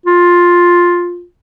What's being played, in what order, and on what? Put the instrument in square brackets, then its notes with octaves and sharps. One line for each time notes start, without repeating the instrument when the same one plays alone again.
[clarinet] F4